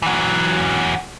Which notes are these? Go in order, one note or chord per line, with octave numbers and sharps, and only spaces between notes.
E3 F#3